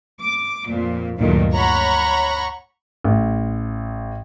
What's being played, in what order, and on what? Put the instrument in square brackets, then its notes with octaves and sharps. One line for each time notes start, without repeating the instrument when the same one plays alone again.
[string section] D6
F2 A#2
D2 G2 A#2 D#3 F#3 A3
C#5 F#5 A#5 B5 C#6 F#6
[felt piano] A1